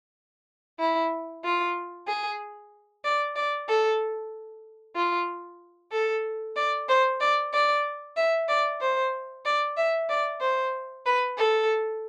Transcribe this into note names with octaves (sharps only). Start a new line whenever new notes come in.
E4
F4
G#4
D5
D5
A4
F4
A4
D5
C5
D5
D5
E5
D5
C5
D5
E5
D5
C5
B4
A4